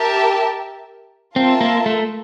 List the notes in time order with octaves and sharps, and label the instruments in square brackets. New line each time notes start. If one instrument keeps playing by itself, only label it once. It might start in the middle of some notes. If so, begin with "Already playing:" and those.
Already playing: [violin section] G4 A#4 E5 A5
[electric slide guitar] C4 [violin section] F4 A#4 E5 A5
[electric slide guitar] A#3
A3